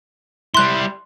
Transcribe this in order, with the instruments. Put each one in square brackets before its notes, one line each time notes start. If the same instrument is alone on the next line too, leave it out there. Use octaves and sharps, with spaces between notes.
[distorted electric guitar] G3 E4 [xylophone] C6 F#6